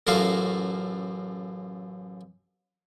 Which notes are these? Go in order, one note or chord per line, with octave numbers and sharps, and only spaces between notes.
A1 F#2 A3 F4 F#4 F5